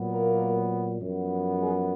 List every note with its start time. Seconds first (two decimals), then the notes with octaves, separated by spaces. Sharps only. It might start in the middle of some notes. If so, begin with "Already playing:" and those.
Already playing: A#2 F#3 B3
0.10 A#3 A#4
1.00 F#2 F3 B3
1.59 G#3 G#4